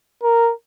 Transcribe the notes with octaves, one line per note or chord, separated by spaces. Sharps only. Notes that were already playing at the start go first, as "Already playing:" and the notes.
A#4